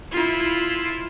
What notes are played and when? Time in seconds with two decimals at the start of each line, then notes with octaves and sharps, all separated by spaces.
0.12 E4 F4